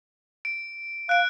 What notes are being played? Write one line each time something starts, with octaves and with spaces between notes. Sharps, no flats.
D7
F5 F#6 D7